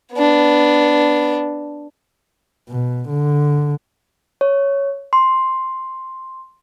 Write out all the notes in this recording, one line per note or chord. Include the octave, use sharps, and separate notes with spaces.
B3 D4
B2
D3
C#5
C6